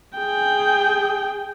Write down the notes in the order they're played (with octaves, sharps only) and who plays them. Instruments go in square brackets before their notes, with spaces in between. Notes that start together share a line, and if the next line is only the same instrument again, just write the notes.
[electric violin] G#4 G5